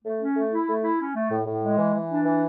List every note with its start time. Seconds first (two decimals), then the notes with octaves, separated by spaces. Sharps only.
0.05 A3
0.20 C#4
0.36 A3
0.52 E4
0.68 A3
0.83 E4
0.99 C#4
1.15 A3
1.31 A2
1.47 A2
1.63 G#3
1.79 E3
1.94 E3
2.10 D4
2.26 E3